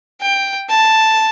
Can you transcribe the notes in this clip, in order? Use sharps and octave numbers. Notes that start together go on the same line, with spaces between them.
G5
A5